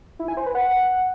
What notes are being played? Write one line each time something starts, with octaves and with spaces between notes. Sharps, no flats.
E4
G#5
C5
B4
F#5